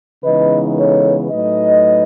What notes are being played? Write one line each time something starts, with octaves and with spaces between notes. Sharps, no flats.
C#3 E3 G#3 B3 D#4 B4 D#5
A4 C#5
A2 F#3 A3 D#4 B4 D#5